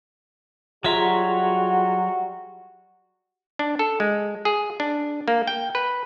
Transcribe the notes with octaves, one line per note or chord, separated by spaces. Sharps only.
F#3 G3 F4 F#4 G#4 E5 A#5 C6
D4
A4
G#3
G#4
D4
A#3
G5
B4